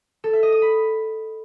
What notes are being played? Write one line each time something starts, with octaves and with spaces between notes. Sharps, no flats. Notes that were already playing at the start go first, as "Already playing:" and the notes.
A4
E5
D#5
D#6
B5